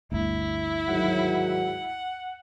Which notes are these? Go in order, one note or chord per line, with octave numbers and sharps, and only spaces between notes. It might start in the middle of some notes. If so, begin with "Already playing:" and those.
G1 D2 E4
G#2 D#3 F#3 F#5